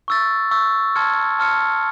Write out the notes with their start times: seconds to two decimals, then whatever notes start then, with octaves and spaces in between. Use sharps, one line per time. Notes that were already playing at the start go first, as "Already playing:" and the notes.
0.08 C#6 E6 A6
0.51 C#6 E6 A6
0.96 A5 C6 F6 G#6 C#7
1.39 A5 C6 F6 G#6 C#7